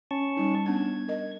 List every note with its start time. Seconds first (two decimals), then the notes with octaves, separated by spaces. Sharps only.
0.11 C#4 A5 C#6
0.37 G3 D#4
0.66 B3 C#4 D4 G#6
1.08 A#4 D#5